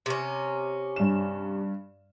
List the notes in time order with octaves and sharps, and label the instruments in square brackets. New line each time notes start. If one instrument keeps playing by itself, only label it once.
[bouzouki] C3 C#4
[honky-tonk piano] G2 E7